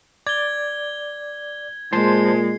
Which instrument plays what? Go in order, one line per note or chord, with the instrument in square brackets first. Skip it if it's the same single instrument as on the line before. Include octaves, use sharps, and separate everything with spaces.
[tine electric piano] D5 [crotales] G#6 G7
[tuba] A#2 [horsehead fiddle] G#3 [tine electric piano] C5 A5 C6 [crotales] C7